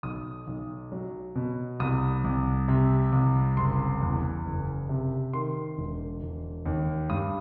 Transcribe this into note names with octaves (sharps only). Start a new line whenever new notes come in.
B1 D#6
B1
F#3
B2
C2 D#6
C2
C3
C2
F#1 C6
E2
F#1
C3
D#3 C6
E1
E1
D#2
G2 D#6